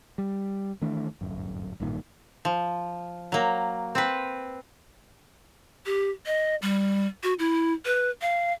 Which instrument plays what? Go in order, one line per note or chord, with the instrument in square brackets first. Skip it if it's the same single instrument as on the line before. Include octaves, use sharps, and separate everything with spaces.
[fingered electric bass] G3
D#3 E3 A3 D4
D1 G1 F#2
A1 G2 A#2 D#3
[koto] F3
F#3 A#3
C4 B4
[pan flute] G4
D#5
G3
F#4
E4
B4
F5